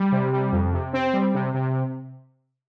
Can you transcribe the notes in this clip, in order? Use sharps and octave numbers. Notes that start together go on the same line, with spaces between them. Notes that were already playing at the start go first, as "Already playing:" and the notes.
Already playing: G3
C3
G3
F2
C3
C4
G3
C3
C3